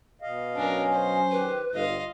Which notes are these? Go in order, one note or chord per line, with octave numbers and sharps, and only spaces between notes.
B2 D#5 F5
F#2 C#4 D4 A#4 G#5
C5
D#3 G4 B4
G1 F4 D#5 F5